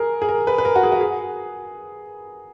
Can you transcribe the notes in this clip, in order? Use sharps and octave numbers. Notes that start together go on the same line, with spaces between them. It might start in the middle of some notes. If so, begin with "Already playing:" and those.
Already playing: G#4 A#4
G#4
A#4
B4
B4
A#4
F#4
G#4
F#4
G#4